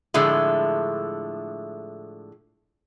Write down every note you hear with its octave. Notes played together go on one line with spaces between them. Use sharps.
A2 D3 F3 G#3 A3